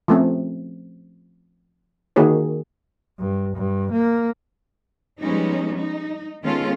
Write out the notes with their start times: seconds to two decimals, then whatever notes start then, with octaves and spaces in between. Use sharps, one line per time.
0.08 F3 A3 C4 C#4
2.16 D#3 A#3 F#4 G#4 C#5
3.19 G2
3.55 G2
3.91 A#3
5.21 F3 G3 G#3 B3 C#4 D#4
5.77 D#4
6.44 D#3 G#3 B3 C#4 F4 A4